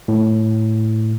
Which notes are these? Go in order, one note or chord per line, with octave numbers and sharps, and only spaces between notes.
A2